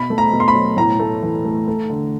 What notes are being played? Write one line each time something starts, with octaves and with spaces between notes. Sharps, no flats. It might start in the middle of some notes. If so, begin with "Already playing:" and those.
Already playing: B2 B5
A3
A#5
B2
C6
B5
F#3
A2 A#5
A3
E3
A3
A3
D3